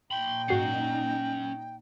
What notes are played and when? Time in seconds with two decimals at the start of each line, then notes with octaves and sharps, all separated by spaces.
0.11 A#2 D#4 G5 B5 C6
0.48 G#2 C#4 F#4 F#5 C7